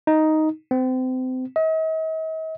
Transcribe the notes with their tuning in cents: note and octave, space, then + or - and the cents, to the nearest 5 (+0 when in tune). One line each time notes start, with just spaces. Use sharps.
D#4 +5
C4 -30
D#5 +45